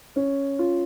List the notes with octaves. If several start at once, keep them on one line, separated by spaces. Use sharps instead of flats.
C#4
F4